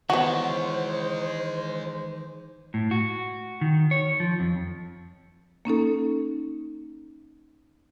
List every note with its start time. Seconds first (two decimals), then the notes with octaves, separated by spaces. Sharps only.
0.10 D#3 E3 G#3 B3 D#4 F#4 C5 C#5
2.74 A2
2.91 F#4
3.61 D#3
3.91 C#5
4.20 F3
4.40 F2
5.65 A#3 C#4 D#4 A4